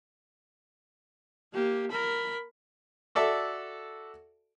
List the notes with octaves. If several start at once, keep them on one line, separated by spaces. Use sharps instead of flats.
A#3 G4
A#4 B5
F#4 A4 D5 E5 A5